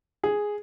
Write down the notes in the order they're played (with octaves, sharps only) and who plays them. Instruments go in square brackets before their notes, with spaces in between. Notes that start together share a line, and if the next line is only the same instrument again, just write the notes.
[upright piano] G#4